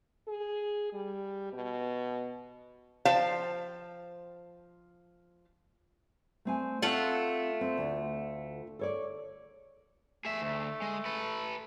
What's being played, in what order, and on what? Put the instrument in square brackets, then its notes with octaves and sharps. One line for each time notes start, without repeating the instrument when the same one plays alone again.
[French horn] G#4
G3
B2
[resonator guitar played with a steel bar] F3 C5 F5 G5 A5
[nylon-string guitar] A3 C4 G#5
[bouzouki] A3 F4 F#5 [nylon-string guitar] C4
[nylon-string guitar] C4
D2
A4 C#5 D5
[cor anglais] A3 [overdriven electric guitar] G#4 E5
[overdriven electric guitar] D2
G#3
A4 B4